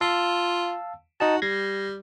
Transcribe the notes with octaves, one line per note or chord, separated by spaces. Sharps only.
F4 F5 A5 E6
D#4 F#4 D#5 A5
G3 G#6 A#6 C7